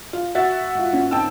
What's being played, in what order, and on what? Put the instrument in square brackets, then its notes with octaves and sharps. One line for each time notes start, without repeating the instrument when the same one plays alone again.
[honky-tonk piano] F4
F#4 E5 A6
[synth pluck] G#2 F4
A#3 C#4
[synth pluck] C4 D#4 E6 [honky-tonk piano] G5 A5